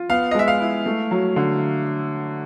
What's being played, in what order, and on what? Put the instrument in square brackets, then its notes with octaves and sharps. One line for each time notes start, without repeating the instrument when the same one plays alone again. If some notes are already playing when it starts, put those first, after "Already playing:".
Already playing: [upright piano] F4
[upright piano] B3 [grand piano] F5
[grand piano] D#5
[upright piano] G#3 [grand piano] E5
[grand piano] F5
[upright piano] E4
A3
F#3
D3